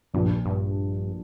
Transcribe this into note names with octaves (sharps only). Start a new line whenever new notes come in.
A#1 G2 A#2 F3 D4
G2